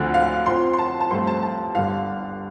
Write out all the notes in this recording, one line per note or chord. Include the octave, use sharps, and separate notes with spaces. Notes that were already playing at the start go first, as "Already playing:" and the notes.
Already playing: D2 D3 F3 A3 C4
F5
F2 F3 C4 C6
C6
A5
A5
G2 F3 A3 C4 C6
A5
A5
G1 G2 D3 F5